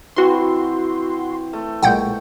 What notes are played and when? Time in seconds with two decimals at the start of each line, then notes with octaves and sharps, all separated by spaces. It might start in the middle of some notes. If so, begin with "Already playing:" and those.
0.16 E3 C4 F#4 C6
1.53 A3
1.83 B1 A#2 G#3 F#5 G5 G6